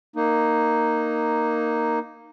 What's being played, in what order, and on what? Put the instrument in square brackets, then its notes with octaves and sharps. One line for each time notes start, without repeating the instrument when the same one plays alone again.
[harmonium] A#3 D#4